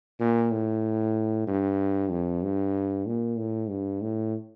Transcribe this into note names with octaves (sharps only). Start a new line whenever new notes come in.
A#2
A2
G2
F2
G2
A#2
A2
G2
A2